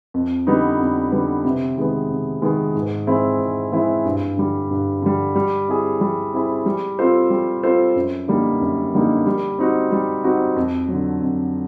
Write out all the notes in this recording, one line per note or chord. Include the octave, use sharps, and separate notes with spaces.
F2
D3 G3 B3 D#4
F2
D3 G3 B3 D#4
C3
D#3 G#3 B3
C3
D#3 G#3 B3
G#2
E3 G#3 C4 E4
G#2
E3 G#3 C4 E4
G2
D3 G3
G2
D3 G3
G3
C4 E4 G#4
G3
C4 E4 G#4
G3
C4 F4 A4 C5
G3
C4 F4 A4 C5
F#2
D3 G3 A#3 D#4
F#2
D3 G3 A#3 D#4
G3
C4 D#4 F#4
G3
C4 D#4 F#4
F2
D3 F#3
F2